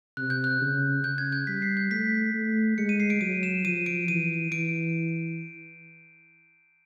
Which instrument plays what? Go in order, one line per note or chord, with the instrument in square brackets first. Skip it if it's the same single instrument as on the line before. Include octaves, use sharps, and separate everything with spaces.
[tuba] C3 [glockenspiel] F#6
[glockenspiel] G6
F#6
[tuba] C#3
[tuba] C#3 [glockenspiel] G6
[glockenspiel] G#6
G6
[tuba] G3 [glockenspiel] B6
[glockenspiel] C7
G6
[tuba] A3 [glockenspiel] B6
[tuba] A3
[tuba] G#3 [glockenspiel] C#7
[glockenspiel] D#7
C7
D7
[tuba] F#3 [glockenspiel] D#7
[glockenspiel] E7
[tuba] F3 [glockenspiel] D#7
[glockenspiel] D7
[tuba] E3 [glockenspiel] D#7
[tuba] E3 [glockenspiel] D7